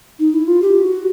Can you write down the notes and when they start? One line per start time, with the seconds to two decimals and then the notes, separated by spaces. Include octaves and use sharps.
0.19 D#4
0.34 E4
0.47 F4
0.62 G4
0.82 F#4